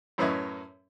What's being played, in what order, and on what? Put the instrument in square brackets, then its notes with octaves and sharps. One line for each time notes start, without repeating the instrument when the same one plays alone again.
[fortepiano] F#2 A2 C#4 B4 D#5 E5